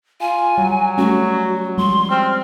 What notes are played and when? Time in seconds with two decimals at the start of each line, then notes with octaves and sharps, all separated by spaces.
0.21 F4 G#5
0.58 F#3 G3
0.98 G3 A3 C#4 F#4
1.78 F3 G3 G#3 C6
2.10 C4 F6